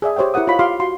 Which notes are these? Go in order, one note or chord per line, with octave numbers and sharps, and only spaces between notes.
G#4 D5 E5
G4 C5 C#5 E5 G5
E4 G4 A#4 F#5 D#6
F4 C#5 D#5 B5
F4 G4 F5 C6 D6
F#4 C6